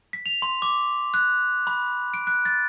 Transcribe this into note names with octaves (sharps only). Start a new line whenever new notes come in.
B6
F7
C6
D6
F#6
B5
D7
F#6
A6